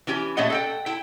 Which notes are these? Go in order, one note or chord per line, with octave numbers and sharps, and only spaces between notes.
E3 C#4 G4 G#5
A#2 A3 C#4 D#5 F#5
A4 F#5 G5
E4 G5